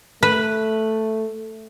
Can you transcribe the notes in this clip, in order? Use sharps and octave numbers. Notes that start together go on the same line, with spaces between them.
A3 B4